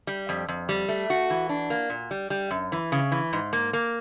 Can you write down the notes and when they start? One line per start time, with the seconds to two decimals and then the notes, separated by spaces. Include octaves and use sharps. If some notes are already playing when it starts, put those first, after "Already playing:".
0.07 G3
0.29 F2
0.49 F2
0.69 G3
0.88 A3
1.10 F#4
1.30 E3
1.49 D4
1.70 A#3
1.90 A#2
2.11 G3
2.30 G3
2.51 F#2
2.72 E3
2.92 C#3
3.12 E3
3.33 G#2
3.53 A#3
3.73 A#3